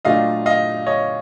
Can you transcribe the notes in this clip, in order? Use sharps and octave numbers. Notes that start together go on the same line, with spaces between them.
A#2 F#3 A3 D4 F4 D#5 F5
D#5 F5
C#5 D#5